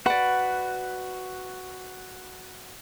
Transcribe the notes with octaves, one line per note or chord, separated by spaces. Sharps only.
F#4 B4 D5 F#5 B5